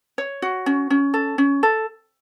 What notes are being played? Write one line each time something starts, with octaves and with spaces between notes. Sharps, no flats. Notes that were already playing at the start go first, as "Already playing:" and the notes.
C#5
F#4
C#4
C#4
A4
C#4
A4